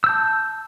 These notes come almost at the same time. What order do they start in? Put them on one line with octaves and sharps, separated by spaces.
E6 G6 A5